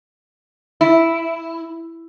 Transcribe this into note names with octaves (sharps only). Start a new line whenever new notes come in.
E4